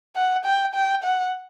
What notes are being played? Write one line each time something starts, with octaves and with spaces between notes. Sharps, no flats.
F#5
G5
G5
F#5